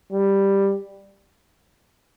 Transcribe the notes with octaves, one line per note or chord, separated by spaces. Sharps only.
G3